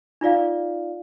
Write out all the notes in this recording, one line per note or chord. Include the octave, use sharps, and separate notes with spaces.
D#4 F4 D5 F5